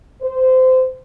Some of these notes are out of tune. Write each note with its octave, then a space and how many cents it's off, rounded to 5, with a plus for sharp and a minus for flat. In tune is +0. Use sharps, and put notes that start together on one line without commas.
C5 -20